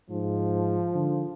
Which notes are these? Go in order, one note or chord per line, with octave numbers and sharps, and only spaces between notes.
G#2 F3
D3